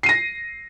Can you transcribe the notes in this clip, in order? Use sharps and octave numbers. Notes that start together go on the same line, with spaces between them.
A#6 C7 D#7